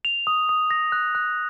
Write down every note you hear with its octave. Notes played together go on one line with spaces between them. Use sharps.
F7
D#6
D#6
A#6
F#6
F#6